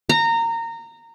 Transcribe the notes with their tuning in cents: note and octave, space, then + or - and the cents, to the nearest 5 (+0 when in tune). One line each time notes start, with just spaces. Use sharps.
A#5 -20